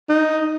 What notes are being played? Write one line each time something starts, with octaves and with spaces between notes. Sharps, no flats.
D#4